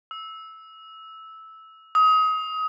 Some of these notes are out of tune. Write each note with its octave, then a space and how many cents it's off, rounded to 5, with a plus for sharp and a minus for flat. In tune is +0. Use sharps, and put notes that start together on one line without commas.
E6 -10
D#6 +25